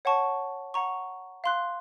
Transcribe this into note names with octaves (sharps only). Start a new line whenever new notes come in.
C#5 F#5 A5 C#6
F#5 A#5 C#6
F5 C6 F#6